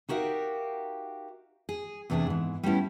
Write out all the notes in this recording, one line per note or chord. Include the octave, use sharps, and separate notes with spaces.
D#4 F#4 G4 A#4 E5 F5
G#4
E2 C3 A3 D4 G#4
G#2 E3
G3 A3 B3 C#4 E4